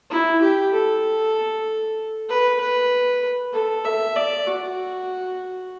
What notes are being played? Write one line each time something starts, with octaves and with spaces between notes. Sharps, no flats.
E4
G4
A4
B4
B4
A4
E5
D5
F#4